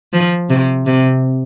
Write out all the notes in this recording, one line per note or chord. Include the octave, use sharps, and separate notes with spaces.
F3
C3
C3